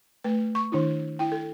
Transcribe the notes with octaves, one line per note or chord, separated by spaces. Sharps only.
A3 B4
C#6
D#3 D4 E4
E4 G5
A4